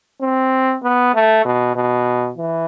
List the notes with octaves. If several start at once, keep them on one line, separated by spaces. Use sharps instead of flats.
C4
B3
A3
B2
B2
E3